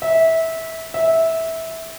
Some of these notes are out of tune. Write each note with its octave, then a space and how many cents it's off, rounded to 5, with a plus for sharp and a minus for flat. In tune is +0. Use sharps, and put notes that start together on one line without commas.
E5 -20
E5 -15